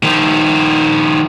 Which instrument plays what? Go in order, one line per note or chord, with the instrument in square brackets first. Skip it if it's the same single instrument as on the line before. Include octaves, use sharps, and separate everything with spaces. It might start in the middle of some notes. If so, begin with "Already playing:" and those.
[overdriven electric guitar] D#3 F3